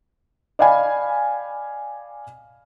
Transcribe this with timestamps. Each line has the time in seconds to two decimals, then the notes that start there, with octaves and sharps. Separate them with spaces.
0.59 D5 D#5 F5 G5 G#5 B5